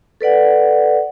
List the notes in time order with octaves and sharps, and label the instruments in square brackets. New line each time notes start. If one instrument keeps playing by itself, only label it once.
[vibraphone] A4 B4 D5 F#5